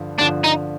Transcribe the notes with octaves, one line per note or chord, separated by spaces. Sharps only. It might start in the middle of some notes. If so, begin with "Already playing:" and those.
Already playing: G2 D3 F3
G2 D3 F3 D4
D#4